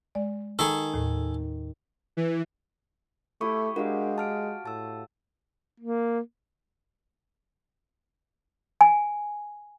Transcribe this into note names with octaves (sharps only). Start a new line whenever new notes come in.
G#3 D5
D#3 G#4 A4
D#2 A2
E3
A3 E4 G4 C#6 D#6
G#3 D4 F#4 G4 A#4 F5
A5 F6 D7
A2 A5 E6
A#3
G#5